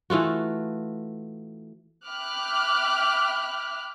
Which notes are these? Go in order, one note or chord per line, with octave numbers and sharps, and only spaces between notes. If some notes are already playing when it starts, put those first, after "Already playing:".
E3 A3 F4 F#4
E5 G5 B5 D6 F6 F#6